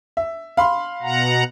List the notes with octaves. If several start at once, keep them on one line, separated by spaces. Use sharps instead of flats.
E5
F5 B5 C6
B2 F#5 A#5